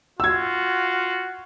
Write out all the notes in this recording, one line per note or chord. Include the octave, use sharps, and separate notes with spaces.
F4 F#4 E6 G#6